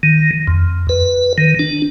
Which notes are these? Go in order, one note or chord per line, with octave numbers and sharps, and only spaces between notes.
D#3
F2
B4
D#3
D4